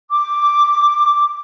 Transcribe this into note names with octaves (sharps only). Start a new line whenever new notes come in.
D6